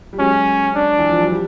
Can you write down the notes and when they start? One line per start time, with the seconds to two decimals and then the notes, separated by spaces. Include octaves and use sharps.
0.13 G3
0.19 F#3 G#3 C#4
0.75 D4
0.98 E3
1.10 F3
1.21 F#3
1.32 G3